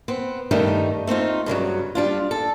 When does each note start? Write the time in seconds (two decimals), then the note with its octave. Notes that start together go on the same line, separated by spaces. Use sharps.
0.08 B3 C4
0.51 G2 D#3 G3 A3 D#4
1.07 A3 C4 D#4 F4
1.46 G2 C#3 E3 F#3
1.95 G3 D4 F4
2.31 A4